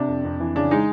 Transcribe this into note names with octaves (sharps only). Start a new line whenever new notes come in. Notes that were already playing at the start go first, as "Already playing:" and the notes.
Already playing: C3 D4
F2
F2
E3
C#3 D4
G#3 D#4